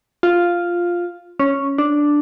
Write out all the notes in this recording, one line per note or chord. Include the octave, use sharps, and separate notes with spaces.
F4
C#4
D4